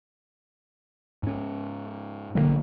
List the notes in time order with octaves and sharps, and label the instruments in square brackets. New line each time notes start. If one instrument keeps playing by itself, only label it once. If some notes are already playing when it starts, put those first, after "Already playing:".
[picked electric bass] G#2 C#4
[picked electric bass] B1 E3 A#3 [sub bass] D3